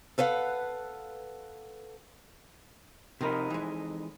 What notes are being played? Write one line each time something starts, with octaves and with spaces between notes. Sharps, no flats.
A4 B4 C5 F5 F#5
F2 C3 F3 D#4 A#4 B5
E3 G#3